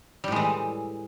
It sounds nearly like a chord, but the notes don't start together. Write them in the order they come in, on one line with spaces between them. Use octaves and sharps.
G3 A2 G#3 E3